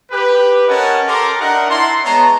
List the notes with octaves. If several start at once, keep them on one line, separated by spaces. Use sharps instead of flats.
G4 B4
C#4 A#4 D#5 F#5 G#5 A5
G4 A4 A#4 A#5 C6 D6
D4 D#4 A#4 E5 F#5
E4 A5 A#5 C6
G#3 B3 C#5 A5 A#5